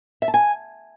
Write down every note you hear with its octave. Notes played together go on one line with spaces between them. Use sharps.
E5
A5
G#5